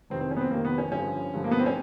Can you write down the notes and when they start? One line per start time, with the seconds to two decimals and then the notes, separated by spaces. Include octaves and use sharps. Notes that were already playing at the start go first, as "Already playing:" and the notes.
0.10 F2 C3 D#3 C4
0.21 C4
0.31 C#4
0.37 B3
0.41 C4
0.51 F2 C3 D#3 A#3
0.65 B3
0.78 C#4
0.92 G2 D3 F3 C#4
1.33 G2 D3 F3
1.44 A#3
1.51 B3
1.59 C4
1.66 C#4